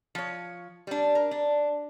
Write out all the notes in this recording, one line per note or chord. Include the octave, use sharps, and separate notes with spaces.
F3 C#5
G3 D4
A#4
D4